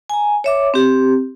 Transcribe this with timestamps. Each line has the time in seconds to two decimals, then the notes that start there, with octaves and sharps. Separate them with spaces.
0.10 G#5 A#5
0.44 C#5 E5 D6
0.74 C4 G4